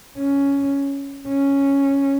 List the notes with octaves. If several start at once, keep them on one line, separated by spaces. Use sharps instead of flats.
C#4
C#4